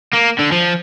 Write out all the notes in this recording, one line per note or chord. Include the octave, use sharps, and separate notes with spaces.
A#3
D3
F3